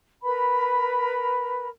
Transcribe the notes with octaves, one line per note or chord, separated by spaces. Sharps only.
A#4 B4 B5